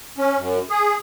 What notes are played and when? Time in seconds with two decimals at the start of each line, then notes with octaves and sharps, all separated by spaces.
0.18 C#4
0.38 F#2
0.70 G#4